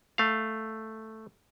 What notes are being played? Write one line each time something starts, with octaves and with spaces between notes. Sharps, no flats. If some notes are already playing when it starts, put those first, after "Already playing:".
A3 F5